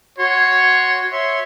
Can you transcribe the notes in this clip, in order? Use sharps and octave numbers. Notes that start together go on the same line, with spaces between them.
F#4 C#5 C6
C#5 E5 C6